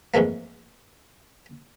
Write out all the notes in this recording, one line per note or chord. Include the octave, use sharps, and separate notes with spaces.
F2 G#2 E3 A3 A#3